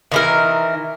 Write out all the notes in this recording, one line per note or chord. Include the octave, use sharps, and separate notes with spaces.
D#3 E3 A#4